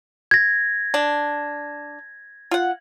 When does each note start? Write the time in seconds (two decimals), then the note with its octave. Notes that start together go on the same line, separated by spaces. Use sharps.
0.31 G#6 A#6
0.94 D4
2.51 F4 F#5